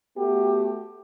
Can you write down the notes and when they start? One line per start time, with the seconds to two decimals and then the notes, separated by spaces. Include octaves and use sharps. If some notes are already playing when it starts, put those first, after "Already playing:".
0.17 A3 B3 F#4 G4